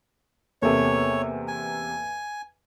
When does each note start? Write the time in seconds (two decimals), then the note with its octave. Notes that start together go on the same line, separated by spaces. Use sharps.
0.62 E2 C3 A#3 B3 A4 C#5
1.48 G#5